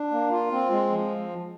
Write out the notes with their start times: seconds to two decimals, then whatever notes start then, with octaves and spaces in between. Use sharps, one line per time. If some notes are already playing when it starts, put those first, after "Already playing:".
Already playing: D4
0.11 A#3
0.31 F4
0.51 C4
0.70 G#3
0.90 F3